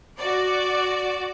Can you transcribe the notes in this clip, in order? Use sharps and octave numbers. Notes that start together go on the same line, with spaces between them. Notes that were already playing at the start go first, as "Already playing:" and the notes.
F#4 D5